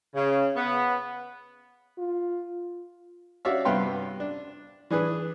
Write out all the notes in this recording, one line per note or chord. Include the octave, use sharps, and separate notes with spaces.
C#3
B3
F4
F#4 C#5 D5 E5 F5
G2 C3 B3 F5 G5 C6
D4
E3 D4 G#4 B4